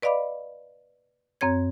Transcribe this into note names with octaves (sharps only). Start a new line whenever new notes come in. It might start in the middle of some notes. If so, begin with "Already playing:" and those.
B4 D5 D#5 F5 B5 D6
F#2 C4 C#5 G#6